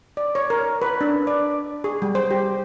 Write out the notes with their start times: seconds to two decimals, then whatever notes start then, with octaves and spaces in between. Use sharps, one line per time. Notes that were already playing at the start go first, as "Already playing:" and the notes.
0.17 D5
0.35 C#5
0.50 A#4
0.82 B4
1.01 D4
1.27 D5
1.84 G#4
2.02 G3
2.15 C5
2.31 G4